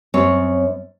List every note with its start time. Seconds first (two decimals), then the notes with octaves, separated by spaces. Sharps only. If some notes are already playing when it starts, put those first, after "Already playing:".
0.14 F#2 C4 C#5